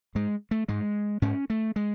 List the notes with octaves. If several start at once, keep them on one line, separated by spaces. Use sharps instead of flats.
G#2 G#3
A3
G#2 G#3
G#2 C#4
A3
G#3